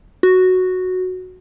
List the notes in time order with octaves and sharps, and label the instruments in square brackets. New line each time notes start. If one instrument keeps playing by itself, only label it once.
[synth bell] F#4